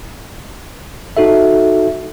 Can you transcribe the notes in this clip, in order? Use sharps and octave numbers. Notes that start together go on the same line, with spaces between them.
D#4 F#4 A4 E5